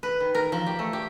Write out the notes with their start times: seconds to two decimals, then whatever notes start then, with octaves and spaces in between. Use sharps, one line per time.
0.03 B4
0.20 D#3
0.35 A#4
0.52 F3
0.66 G4
0.79 A3
0.93 G4